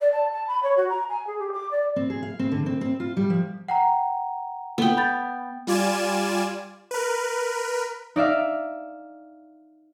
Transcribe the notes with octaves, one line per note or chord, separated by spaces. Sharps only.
D5
A5
A5
B5
C#5
F#4
A#5
G#5
G#4
G4
D6
D5
C4
G#4
F5
C4
D3
C4
C4
F4
G3
F3
F#5 G5 A#5
B3 A4 G5
B5 G6 A6
G3 F4 D5 G#5 E7
A#4 B4
D#4 D5 E5 F5